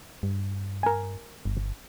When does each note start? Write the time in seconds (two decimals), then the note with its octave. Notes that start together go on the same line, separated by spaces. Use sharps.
0.23 G2
0.83 A#4 G#5
1.45 G1